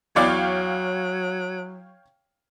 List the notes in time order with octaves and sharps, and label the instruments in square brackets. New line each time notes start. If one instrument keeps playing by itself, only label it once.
[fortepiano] E2 D5 D6 [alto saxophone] F#3 [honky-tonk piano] C#5 F5 G5